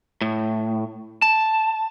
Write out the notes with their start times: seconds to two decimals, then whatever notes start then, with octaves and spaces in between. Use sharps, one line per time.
0.21 A2
1.22 A5